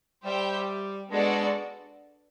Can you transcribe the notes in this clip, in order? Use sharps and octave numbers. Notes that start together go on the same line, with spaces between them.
G3 G4 C5 E5 G5
G#3 B3 D4 F#4 A4 D5